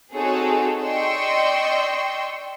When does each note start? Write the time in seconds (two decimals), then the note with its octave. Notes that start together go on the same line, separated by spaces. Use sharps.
0.13 C4 D#4 F#4 G#4 A4 C#5
0.84 D5 D#5 G5 C6 C#6 E6